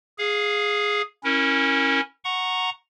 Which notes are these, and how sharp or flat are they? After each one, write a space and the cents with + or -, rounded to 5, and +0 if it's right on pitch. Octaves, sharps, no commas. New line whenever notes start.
G#4 +0 F5 +20
C#4 -15 E4 -15 A#4 +0
F#5 +0 A#5 +0 C#6 -15